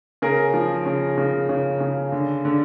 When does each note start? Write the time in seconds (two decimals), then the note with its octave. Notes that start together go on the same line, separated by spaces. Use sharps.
0.22 C#3 G#4 A#4
0.54 F3
0.86 C#3
1.18 C#3
1.49 C#3
1.80 C#3
2.12 D3
2.45 D3